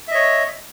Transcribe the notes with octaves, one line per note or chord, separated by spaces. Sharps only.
C#5 D#5 E5